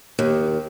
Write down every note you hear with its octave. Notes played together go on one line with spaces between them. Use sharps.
D#2